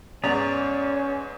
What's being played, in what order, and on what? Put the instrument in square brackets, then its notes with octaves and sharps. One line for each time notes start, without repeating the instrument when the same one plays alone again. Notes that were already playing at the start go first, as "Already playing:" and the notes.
[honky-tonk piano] E2 G#2 G#3 [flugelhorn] C#4 [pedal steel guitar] G#4 D5 A#5